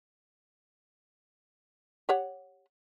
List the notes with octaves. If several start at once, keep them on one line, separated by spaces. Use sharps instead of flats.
G4 C#5 F#5